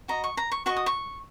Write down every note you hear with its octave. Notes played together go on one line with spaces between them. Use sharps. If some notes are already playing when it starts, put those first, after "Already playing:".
F#4 D#5 A#5
C#6
A#5
C#6
F#4 D#5 C#6
D#6
C#6